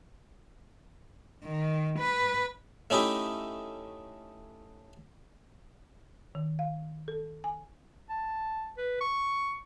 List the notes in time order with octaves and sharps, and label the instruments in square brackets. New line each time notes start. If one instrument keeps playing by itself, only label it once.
[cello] D#3
B4
[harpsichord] A3 C#4 D#4 E4 G4
[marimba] D#3
F5
A4
G#5
[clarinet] A5
B4
C#6